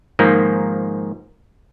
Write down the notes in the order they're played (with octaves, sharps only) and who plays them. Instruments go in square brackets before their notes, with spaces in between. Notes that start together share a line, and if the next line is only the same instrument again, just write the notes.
[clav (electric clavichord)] G#2 D#3 F3 A#3